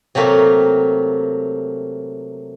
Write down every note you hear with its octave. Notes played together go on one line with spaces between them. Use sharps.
C3 F#3 A3 A#3